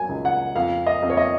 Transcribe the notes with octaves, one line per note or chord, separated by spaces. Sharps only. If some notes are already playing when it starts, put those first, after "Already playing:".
Already playing: F#3 G#5
C#2
F#5
F2 F5
D#5
F2
C#5
D#5